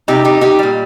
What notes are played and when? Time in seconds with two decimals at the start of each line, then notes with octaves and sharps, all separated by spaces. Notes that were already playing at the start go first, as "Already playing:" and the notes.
0.08 C3 G3 D#4 G4
0.25 D#4 G4
0.41 D#4 G4
0.59 A#2 G3